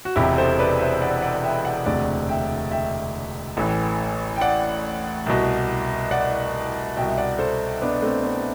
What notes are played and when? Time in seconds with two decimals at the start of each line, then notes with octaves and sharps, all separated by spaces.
0.05 F#4
0.16 E1 E2 C3 E4 G4
0.37 A4 C5
0.59 B4 D5
0.79 C5 E5
1.01 D5 F#5
1.22 D5 F#5
1.43 E5 G5
1.64 D5 F#5
1.86 E1 D2 C3 D5 F#5
2.29 E5 G5
2.71 E5 G5
3.57 A1 A2 E3
4.36 G5
4.41 D5 F#5
5.26 C2 B2
6.11 D5 F#5
6.96 C2 B2 E5 G5
7.17 D5 F#5
7.39 A4 C5
7.82 B3 D4
8.02 A3 C4
8.24 B3